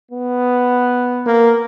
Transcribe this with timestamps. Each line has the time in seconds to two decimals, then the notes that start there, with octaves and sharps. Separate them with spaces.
0.10 B3
1.25 A#3